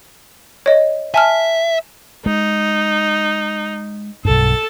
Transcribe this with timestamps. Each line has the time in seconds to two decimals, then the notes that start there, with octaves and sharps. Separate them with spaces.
0.66 C#5 D#5
1.14 E5 G#5 A5 F6
2.26 G#3 D#4
4.25 B1 G2 A4 A5